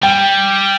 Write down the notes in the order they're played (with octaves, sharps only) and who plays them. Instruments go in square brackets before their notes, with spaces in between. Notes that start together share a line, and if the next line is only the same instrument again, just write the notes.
[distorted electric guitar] G3 [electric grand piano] G5